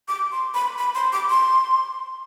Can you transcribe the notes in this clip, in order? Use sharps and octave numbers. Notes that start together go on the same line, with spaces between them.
D6
C6
B5
B5
C6
D6
C6